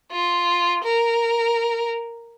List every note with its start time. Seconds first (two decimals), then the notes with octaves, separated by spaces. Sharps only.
0.12 F4
0.84 A#4